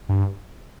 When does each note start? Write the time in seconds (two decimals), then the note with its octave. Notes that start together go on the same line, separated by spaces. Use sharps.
0.09 G2